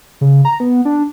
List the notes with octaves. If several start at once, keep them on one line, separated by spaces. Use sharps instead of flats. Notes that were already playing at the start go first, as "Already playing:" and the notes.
C#3
A#5
B3
D4